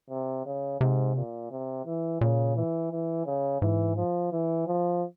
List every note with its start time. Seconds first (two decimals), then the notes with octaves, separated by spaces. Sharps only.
0.10 C3
0.46 C#3
0.81 G#2 C3
1.16 A#2
1.51 C3
1.86 E3
2.21 A#2 C#3
2.56 E3
2.91 E3
3.26 C#3
3.61 G#2 E3
3.96 F3
4.32 E3
4.67 F3